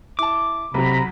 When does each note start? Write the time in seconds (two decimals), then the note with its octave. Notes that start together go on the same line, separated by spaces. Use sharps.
0.19 E4 A5 D6
0.74 B1 C3 F#3 A#5 B5